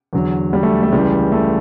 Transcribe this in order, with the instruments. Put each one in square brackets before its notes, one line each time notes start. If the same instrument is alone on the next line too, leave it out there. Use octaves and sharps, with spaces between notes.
[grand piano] E2 D3 F#3
G3
A3
A3
C#2 C#3 E3 G3
A3